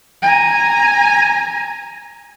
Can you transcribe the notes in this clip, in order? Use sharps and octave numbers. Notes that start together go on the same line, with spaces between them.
G#5 A#5